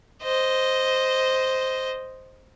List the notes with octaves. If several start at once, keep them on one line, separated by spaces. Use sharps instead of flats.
C5 D#5